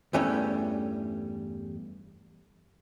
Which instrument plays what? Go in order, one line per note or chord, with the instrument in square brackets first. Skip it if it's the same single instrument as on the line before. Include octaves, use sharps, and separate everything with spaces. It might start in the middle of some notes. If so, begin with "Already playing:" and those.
[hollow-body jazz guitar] E2 G2 E3 G3 A3 C#4